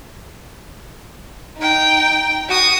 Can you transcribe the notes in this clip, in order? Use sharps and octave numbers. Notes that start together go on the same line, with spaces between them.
D#4 G5
F#4 D#6